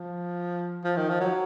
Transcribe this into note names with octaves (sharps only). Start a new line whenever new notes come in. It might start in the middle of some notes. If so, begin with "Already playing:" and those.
Already playing: F3
F3
D#3
F3
F#3